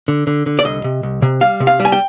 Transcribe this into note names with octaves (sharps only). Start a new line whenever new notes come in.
D3
D3
D3
D5
C2 D#5
C3
C2
C3
G3 F5
C3
F5
G3
G#5
G5